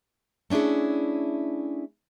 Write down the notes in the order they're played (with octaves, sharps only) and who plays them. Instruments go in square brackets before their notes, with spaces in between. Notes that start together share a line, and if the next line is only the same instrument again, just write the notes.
[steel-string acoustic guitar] A3 C#4 D4 E4 G#4